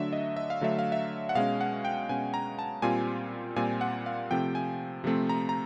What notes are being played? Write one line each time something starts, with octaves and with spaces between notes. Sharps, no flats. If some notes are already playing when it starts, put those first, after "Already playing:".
Already playing: D3 F#3 A3 D4 E5
D#5
E5
F5
D3 F#3 A3 D4 E5
F5
E5
F#5
B2 G#3 C#4 F5
F#5
G5
B2 G#3 C#4 G#5
A#5
A5
A#2 G3 C4 F4 G#5
A#2 G3 C4 F4 G#5
F#5
F5
C3 F3 A3 C4 G5
G#5
C3 F3 A3 C4
A#5
A#5